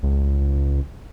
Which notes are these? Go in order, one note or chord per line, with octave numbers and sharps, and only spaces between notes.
C#2